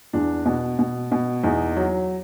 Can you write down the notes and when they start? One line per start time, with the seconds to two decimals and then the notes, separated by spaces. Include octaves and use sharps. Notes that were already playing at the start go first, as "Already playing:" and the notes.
0.13 E2 D4
0.46 B2
0.79 B2
1.12 B2
1.44 E2 D#4
1.77 F#3